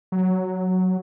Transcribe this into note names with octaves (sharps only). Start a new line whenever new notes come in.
F#3